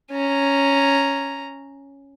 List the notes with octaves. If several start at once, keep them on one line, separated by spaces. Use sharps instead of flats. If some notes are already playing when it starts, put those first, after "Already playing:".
C#4 A#5